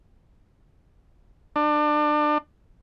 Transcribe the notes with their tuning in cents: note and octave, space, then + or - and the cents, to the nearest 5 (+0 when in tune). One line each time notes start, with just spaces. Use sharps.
D4 +30